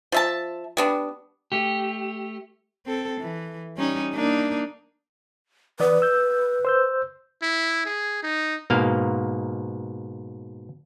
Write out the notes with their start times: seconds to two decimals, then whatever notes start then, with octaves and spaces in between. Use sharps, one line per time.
0.12 F3 E5 A5
0.77 G3 B3 D4
1.52 A3 G4
2.86 C4 A4
3.20 E3
3.77 G3 C#4 D#4
4.14 A#3 D4 D#4
5.80 E3 B4 D5 D#6
6.02 E6 G6
6.65 C5 E6 G6
7.42 E4
7.85 G#4
8.23 D#4
8.70 G#2 B2 A#3 F5